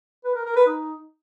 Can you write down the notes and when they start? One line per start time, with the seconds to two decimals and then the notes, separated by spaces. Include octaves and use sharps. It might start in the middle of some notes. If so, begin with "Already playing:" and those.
0.25 B4
0.35 A#4
0.46 A#4
0.56 B4
0.67 D#4